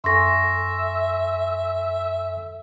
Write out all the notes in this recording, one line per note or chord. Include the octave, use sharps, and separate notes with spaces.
F#2 A4 E5 G#5 C6 C#6 A#6